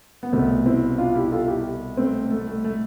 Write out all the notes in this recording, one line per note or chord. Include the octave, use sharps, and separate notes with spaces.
B3
C2 B2 A3 C4
C4 E4
D4 F4
E4 G4
F4 A4
E4 G4
A3 C4
A3
A3
A3